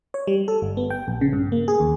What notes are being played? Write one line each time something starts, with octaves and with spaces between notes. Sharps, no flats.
C#5
G3
A4
G1
B3
G5
A#1
C#3
G2
A#3
G#4
D#2